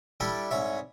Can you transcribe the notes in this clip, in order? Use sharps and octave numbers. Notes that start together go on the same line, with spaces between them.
G3 D4 E4 G4 A4
C2 G#2 C#5 E5